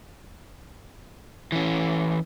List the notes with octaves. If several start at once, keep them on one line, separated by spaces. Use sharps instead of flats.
E3 C#4